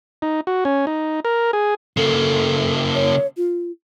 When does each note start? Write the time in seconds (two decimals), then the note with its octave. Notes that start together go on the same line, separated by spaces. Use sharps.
0.22 D#4
0.47 F#4
0.65 C#4
0.87 D#4
1.25 A#4
1.53 G#4
1.97 C#3 A#3 A4
2.95 C#5
3.37 F4